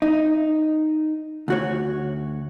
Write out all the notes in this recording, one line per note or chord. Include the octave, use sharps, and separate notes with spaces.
D#4
D2 F#4 C#5